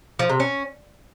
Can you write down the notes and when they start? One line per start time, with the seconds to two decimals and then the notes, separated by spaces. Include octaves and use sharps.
0.19 F3
0.30 C3
0.40 C#4